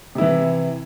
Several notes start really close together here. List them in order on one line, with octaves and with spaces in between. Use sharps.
C3 E4 E3